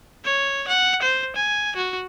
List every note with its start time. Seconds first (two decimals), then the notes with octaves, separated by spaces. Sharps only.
0.25 C#5
0.68 F#5
1.02 C5
1.36 G#5
1.76 F#4